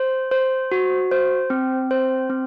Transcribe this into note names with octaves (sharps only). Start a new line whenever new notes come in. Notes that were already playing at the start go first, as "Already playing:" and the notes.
Already playing: C5
C5
F#4
C5
C4
C5
C4